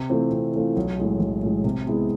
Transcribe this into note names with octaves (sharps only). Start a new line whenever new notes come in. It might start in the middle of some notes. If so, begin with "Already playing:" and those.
Already playing: C3
E3 A3 C4 F4
C3
E3 A3 C4 F4
B1
A2 E3 G#3
B1
A2 E3 G#3
C3
G#3 B3 E4 G#4